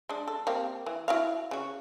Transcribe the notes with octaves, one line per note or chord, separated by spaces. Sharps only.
G#3 D4
A4
A#3 C4 G4
E3
E4 F#4 F5
C#3 F#4